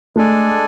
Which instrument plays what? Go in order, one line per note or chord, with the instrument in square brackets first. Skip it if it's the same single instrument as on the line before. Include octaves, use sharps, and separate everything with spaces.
[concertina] G#3 D4 A4 D5 G#5 [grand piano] A3